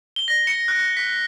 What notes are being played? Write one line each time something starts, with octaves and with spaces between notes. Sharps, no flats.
G7
A#6
C#7
F#6
B6